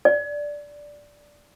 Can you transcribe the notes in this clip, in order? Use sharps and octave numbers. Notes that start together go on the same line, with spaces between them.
D5